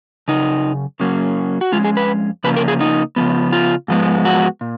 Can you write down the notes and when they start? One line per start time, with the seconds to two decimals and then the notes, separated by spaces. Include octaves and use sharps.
0.28 F#2 C#3 D#4
1.00 F#2 C#3 F#3 A#3 C#4
1.61 F#4
1.72 F2 C#3 G#3 C#4 F4
1.84 G#4
1.97 B4
2.44 C#3 F3 A#3 C#4 B4
2.56 A#4
2.68 G#4
2.80 D#4
3.16 C#3 F3 B3
3.53 F4
3.88 G#2 F3 G#3 B3
4.25 F#4
4.61 A#2